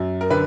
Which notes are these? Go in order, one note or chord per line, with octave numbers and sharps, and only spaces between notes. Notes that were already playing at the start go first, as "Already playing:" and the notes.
Already playing: F#2
A#4
D3 B4